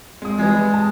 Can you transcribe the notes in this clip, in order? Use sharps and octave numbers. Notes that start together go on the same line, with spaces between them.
G#3 D#6
E3 G3 G#3 B4
A5